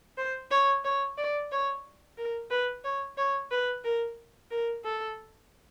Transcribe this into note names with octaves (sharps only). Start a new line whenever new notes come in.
C5
C#5
C#5
D5
C#5
A#4
B4
C#5
C#5
B4
A#4
A#4
A4